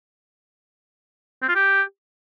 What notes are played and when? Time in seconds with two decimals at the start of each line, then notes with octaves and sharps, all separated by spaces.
1.42 C4
1.49 F4
1.55 G4